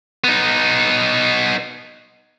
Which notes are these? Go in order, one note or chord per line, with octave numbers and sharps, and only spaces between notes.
B3 D#4